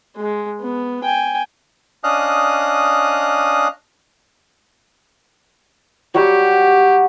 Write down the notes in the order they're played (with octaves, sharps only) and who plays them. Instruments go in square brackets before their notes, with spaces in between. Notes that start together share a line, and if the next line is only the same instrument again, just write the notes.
[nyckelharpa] G#3
B3
G5 G#5
[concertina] C#4 D4 D#5 F5 D#6 F#6
[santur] F#3 G3 F#4 [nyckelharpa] G4